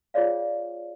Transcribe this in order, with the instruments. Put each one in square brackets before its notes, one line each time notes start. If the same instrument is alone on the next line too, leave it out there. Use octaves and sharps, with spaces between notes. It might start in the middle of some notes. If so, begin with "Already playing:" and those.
[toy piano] F4 G#4 C#5 D5 F5